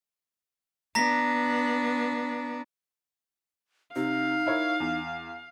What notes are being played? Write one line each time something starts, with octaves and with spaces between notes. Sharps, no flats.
B3 D4 A#5 A#6 B6
C3 D#4 F5
E4 A#4 C#5
E2